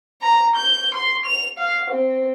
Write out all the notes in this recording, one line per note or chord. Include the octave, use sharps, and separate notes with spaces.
A#5
G6
C6
F7
F5
C4